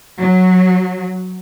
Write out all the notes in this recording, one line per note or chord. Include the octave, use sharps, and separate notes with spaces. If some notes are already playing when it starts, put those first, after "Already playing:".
F#3